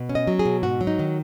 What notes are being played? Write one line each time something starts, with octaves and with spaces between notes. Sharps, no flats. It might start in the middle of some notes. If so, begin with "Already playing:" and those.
Already playing: B2
C#4
D#5
F#3
G#4
B2
G#2 F#4
F#3
D#4
D#3